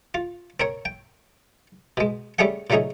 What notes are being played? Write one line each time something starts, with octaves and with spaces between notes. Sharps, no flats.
F4
C4 A#4 C#5
G5
B2 G#3
G3 A3 C#4 G#4 F#5
A#2 C#3 F#3 A3 D#4 G#4